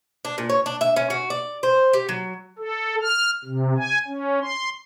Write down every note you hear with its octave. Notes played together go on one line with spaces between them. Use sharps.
D4
A#2
C#5
D4
E5
C#4
F#4
D5
C5
G4
F#3
A4
F6
C3
G#5
C#4
C6